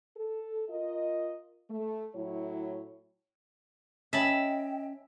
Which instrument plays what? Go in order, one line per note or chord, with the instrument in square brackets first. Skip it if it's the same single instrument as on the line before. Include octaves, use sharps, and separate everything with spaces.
[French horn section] A4
F4 A#4 D#5
A3
A2 F#3 E4 C#5
[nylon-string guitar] C#4 [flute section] D#5 G5 [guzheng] E5 A5 B5